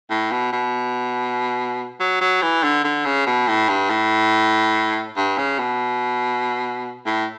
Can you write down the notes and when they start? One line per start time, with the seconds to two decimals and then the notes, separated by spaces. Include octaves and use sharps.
0.10 A2
0.32 B2
0.53 B2
2.00 F#3
2.21 F#3
2.42 E3
2.63 D3
2.85 D3
3.06 C#3
3.27 B2
3.48 A2
3.69 G2
3.90 A2
5.17 G2
5.38 C#3
5.59 B2
7.06 A2